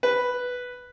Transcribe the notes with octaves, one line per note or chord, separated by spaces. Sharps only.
B4